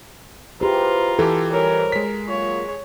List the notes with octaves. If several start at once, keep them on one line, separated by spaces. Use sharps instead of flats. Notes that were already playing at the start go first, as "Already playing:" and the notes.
E4 F4 G4 G#4 B4 C5 A#5
E3 G4 A4
G3 A#4 C5 C#5
G#3 B6
F#3 A#3 F4 C#5